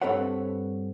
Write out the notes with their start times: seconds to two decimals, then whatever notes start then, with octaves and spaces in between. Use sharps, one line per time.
0.01 G2 C4 A4 B4 C#5 F#5